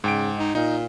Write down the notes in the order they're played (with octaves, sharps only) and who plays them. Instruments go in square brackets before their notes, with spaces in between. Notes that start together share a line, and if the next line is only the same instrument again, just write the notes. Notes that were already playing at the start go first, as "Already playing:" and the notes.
[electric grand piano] G#2 G5 D7 [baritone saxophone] C#3
[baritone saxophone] D#4
[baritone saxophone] A#2 [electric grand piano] D#4